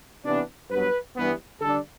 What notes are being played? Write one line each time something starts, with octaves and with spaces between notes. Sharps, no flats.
C3 E3 B3 D4
G2 F#3 B3 B4
G2 E3 G3 B3
D3 G3 D4 A4